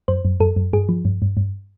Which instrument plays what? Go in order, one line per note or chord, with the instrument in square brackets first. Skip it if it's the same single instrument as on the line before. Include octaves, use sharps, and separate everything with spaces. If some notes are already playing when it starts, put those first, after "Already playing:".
[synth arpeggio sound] F#2 C5
F#2
F#2 A4
F#2
G2 G#4
F3
G2
G2
G2